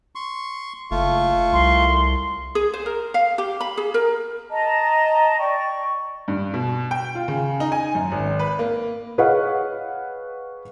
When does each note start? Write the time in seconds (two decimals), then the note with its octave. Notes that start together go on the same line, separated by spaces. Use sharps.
0.15 C6 C#6
0.91 F#1 A3 F4 C#6
1.53 C2 C6
2.55 G#4
2.74 C5
2.86 A#4
3.14 F5
3.38 G4
3.60 B5
3.77 G#4
3.94 A#4
4.50 D#5 A5 A#5
5.39 D5 G5 C#6
6.28 G2
6.54 B2
6.91 G5
7.15 F4
7.28 C#3
7.60 D#4
7.72 G#5
7.95 F#2
8.12 G#1
8.39 B4
8.59 A#3
9.18 G#4 B4 C#5 D#5 F5 F#5